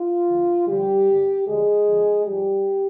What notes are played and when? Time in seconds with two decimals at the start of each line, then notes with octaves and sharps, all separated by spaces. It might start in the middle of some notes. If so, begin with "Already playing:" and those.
Already playing: F4
0.28 D2 D3 F3
0.67 D2 D3 F3 G3 G4
1.08 G2 D3 G3
1.47 D2 D3 F3 G#3 G#4
1.87 F2 D3 F3
2.26 G#2 F3 G3 G4